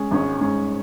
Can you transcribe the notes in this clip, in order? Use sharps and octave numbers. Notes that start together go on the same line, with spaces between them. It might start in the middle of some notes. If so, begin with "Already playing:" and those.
Already playing: G#3 C#4
G#1 G#2 G#3 C#4
G#2 G#3 C#4